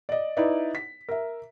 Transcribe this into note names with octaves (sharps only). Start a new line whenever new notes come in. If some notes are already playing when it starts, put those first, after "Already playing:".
D5 D#5
D#4 E4 B4 D5
B6
A#4 E5